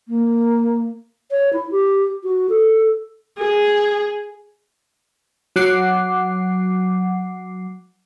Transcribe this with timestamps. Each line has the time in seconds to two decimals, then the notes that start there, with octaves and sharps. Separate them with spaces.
0.08 A#3
1.31 C#5
1.53 E4
1.71 G4
2.24 F#4
2.49 A4
3.38 G#4
5.56 F#3 F#5 D6 C7